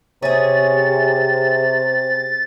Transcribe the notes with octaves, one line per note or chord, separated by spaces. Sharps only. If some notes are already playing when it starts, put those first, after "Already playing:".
C3 C#4 G#4 A6